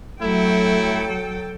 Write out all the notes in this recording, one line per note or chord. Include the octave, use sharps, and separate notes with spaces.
F#3 A3 E4 A4 G5